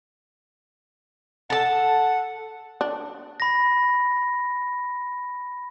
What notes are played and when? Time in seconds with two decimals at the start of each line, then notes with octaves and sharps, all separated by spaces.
1.50 A4 F#5 A5
2.81 D4
3.40 B5 A#6